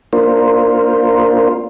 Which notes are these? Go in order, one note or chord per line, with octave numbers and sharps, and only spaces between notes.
A#3 D4 F4 A#4 C5